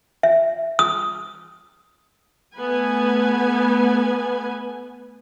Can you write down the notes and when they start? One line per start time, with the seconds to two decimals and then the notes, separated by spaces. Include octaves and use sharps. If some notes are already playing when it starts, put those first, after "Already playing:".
0.23 E5
0.79 D#6
2.56 A3 B3 B4 G#5